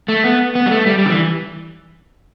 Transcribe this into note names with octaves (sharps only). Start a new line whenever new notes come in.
A3
B3
B3
G3
A3
G3
G3
D3
E3